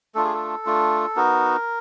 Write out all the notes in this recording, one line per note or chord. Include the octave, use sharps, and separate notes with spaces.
A3 D4 F4 A4
G#4
A4
A3 D4 F4
B3 D#4 F#4 A#4